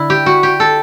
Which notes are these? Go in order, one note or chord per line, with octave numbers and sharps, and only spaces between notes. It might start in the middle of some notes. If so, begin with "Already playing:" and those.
Already playing: D3 E4
G4
F#4
G4
A4